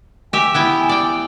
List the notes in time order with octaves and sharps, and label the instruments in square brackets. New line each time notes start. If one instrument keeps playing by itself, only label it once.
[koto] G4 E5 [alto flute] G#5
[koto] B3 E4 G5
D5 G5